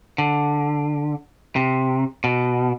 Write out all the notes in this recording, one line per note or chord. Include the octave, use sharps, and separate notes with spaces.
D3
C3
B2